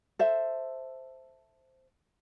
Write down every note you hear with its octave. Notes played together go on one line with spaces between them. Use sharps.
A4 C5 E5